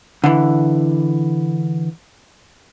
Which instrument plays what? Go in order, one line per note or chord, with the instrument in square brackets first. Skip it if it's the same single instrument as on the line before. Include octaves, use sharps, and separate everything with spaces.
[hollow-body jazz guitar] D3 E3